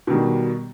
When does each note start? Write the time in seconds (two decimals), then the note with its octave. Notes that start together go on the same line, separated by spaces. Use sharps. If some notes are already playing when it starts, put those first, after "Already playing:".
0.07 B2
0.10 D#3
0.13 G3